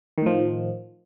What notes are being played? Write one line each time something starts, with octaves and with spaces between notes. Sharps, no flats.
A2 D#3 F3